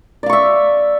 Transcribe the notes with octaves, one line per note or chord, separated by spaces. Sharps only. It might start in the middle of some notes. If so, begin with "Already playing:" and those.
D5 E5 F5 C#6